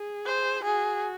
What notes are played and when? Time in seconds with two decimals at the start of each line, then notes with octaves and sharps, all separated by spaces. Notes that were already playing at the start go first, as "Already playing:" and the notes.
Already playing: G#4
0.26 C5
0.64 F#4 G#4